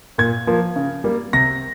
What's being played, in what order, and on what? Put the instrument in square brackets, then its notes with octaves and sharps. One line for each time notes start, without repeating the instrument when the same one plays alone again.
[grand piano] A#2 G#6
F3 A#3
C#3
G3 A#3
C3 A#6